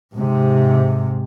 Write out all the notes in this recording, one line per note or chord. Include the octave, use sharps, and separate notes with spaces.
G#2 C3